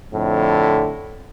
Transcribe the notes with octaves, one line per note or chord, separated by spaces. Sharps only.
F2 A2 D3